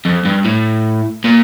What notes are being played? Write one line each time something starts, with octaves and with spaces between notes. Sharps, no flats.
F2
G2
A2
A#2